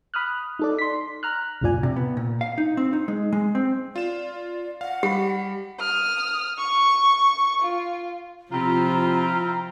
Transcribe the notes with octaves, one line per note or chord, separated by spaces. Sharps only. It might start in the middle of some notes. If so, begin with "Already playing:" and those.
B5 D#6 F6 F#6
D#4 A4 D5
C6 B6
A#5 F6 F#6
C2 F2 A2 F4 D5 G#5
C3
B3
A#2
F5
D#4
C4
D#4
G#3
G#3
C4
F4 D5 E7
F5 F#5
G3 G4 B5
D#6 F6
C#6
F4
C3 F3 C4 E4 F4 A#5